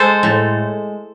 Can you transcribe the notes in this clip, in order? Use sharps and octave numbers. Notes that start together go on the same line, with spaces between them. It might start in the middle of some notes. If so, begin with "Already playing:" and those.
Already playing: G#3 A4 C5
A2